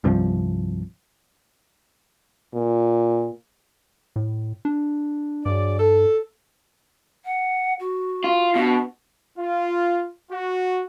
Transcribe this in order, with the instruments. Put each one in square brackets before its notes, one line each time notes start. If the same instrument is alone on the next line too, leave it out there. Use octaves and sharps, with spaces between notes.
[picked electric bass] C2 G2 C3 F3
[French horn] A#2
[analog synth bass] A2
D4
[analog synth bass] G2 [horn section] F#3 G#4 D5
[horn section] A4
[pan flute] F#5
F#4
[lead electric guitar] F4
[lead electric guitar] B2 [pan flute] D4
[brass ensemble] F4
F#4